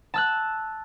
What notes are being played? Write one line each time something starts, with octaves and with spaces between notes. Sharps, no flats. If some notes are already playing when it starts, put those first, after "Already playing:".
A5 E6 F#6